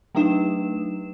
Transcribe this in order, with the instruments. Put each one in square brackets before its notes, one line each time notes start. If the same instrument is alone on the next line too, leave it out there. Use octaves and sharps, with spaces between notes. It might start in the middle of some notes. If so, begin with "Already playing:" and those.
[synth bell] F#3 A3 D4 D#4 B4 E7